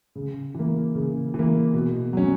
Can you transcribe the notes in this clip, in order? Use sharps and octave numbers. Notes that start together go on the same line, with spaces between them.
C#3
E3 A#3
C#3
E3
A#3
B2
F#3 C#4